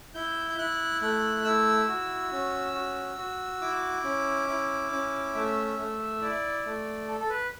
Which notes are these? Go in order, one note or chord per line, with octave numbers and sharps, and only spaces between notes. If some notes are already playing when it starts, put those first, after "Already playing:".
E4 G6
G6
E4 F#6
A3 F#6
E4 E6
F#4
C#4
F#4
F#4
E4 D6
C#4
E4
C#4
A3 E5
A3
E4 D5
A3
A4
A4
B4